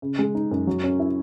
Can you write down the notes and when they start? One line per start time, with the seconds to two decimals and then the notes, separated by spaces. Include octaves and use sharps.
0.02 C#3
0.19 G#3
0.35 D#4
0.51 F#2
0.67 F#3
0.84 C#4
1.00 E4